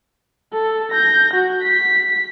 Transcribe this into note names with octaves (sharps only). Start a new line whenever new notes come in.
A4
G6 A#6
F#4
B6